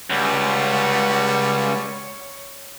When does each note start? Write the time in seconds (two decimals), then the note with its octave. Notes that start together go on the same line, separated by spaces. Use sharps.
0.10 C#2 G3 C#5 F#5